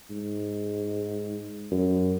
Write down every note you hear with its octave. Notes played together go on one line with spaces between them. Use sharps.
G#2
F#2